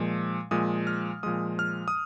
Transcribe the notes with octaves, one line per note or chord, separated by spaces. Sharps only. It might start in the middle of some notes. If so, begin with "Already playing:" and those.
Already playing: A#2 F3 G#3
A#2 F3 G#3 D#6
F6
A#2 F3 G#3 D#6
F6
D#6